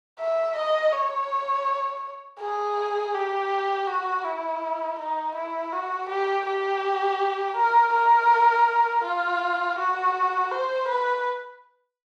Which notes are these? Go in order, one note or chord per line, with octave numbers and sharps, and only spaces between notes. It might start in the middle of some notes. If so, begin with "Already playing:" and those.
E5
D#5
C#5
G#4
G4
F#4
E4
D#4
E4
F#4
G4
G4
A#4
A#4
F4
F#4
C5
B4